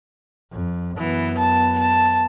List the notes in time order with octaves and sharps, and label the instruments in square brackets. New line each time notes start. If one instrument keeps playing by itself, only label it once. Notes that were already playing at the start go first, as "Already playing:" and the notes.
[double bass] F2
[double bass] F#2 B3 [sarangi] E3
[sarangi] A5
A5